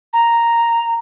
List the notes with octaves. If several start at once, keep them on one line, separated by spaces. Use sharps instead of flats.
A#5